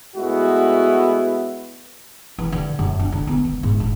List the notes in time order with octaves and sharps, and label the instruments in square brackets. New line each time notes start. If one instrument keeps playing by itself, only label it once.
[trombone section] A2 G#3 B3 E4 F#4
[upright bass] E3
D3
F#2
D4
D3
B3
D#3
G#2
D#4